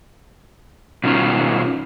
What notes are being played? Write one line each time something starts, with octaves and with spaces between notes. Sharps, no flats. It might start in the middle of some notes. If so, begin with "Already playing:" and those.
B2 D#3 C#4 F4